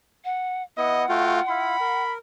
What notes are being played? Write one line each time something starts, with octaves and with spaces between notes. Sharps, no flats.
F#5
B3 E4 D#5 F#5
A3 F4 F#4 G5
E4 F4 B5
A#4